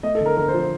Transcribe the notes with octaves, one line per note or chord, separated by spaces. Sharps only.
A3 D#5
A4
D3
A#4
D3 A#4
C5
F3
C5